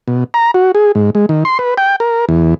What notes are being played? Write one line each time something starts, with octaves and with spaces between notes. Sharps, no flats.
B2
A#5
F#4
G#4
G#2
G#3
D#3
C6
B4
G5
A#4
E2